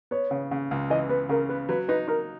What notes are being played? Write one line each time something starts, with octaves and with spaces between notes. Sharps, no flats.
B3 C#5
C#3
C#3
C#2
E3 D#5
B3 B4
C#3 A#4
B3 B4
F#3 B4
D#4 B4
D#4 A#4